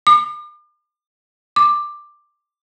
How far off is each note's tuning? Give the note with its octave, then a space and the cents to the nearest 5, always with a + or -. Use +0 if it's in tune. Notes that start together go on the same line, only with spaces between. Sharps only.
D6 +40
D6 +10